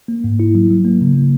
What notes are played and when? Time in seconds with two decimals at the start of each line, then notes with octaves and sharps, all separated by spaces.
0.08 A#3
0.24 G#2
0.40 E4
0.55 F#3
0.70 F#3
0.85 A#3
1.01 C#3
1.16 A#3